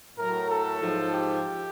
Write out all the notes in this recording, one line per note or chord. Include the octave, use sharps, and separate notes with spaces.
A2 F#3 A#4
A4
G#2 F3
G4